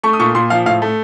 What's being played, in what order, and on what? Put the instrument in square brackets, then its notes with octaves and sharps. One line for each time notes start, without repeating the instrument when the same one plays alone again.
[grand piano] A3 C#6
D#6
A#2 C#6
A#2 C6
F3 F5
A2 F5
A3